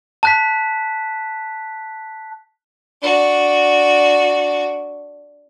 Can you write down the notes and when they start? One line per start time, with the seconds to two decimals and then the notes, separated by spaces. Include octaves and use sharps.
0.23 A5 F#6 B6
3.02 D4 F#4